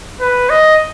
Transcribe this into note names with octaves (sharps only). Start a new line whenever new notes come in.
B4
D#5